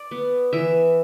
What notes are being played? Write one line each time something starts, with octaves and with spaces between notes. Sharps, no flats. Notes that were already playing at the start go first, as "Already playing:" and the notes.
Already playing: D5
B3
E3 E5